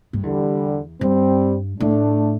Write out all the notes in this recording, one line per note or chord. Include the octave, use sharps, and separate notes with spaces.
G2
E2 D3 G3
G2 G3 C4
A2 A3 D4